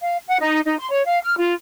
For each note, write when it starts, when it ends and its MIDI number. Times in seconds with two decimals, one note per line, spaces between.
0.01 0.18 77
0.27 0.36 78
0.40 0.60 63
0.64 0.77 63
0.78 0.87 84
0.89 1.03 73
1.05 1.19 77
1.22 1.34 89
1.38 1.53 65